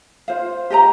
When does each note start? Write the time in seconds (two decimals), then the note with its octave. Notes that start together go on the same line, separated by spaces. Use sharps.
0.28 F4 C5 F5
0.70 G4 D#5 G5 A#5